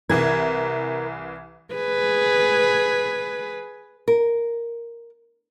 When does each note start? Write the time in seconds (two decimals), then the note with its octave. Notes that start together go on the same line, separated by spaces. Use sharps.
0.09 C2 E3 A#4 G#6
1.75 G#4 B4
4.08 A#4